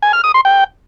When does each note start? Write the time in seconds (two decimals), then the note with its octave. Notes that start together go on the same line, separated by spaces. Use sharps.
0.02 G#5
0.13 F6
0.24 D#6
0.34 C6
0.45 G5